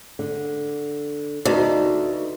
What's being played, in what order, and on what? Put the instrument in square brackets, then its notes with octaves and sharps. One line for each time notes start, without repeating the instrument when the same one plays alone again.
[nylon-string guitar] D3
[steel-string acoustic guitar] D2 [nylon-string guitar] D#4 B4 D5